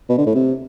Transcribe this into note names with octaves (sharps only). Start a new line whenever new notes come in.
B2
D3
A2
C3